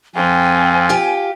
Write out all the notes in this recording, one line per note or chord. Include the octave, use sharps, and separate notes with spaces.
F2 C4 G5 G#5
F4 G4